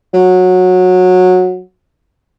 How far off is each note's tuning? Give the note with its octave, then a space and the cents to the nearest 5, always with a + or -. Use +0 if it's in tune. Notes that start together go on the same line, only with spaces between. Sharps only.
F#3 -15